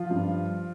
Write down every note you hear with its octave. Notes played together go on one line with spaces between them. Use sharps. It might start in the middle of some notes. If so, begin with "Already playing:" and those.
Already playing: F3 F4
G2